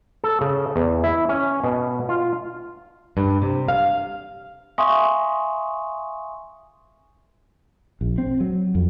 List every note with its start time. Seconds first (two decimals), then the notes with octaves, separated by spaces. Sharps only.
0.24 A4
0.41 C#3
0.76 E2
1.04 E4
1.29 C#4
1.63 B2
2.09 F4
3.17 G2
3.42 C3
3.68 F5
4.78 E5 F5 G#5 C6 C#6 D#6
8.01 A#1
8.18 C4
8.40 F#3
8.75 F2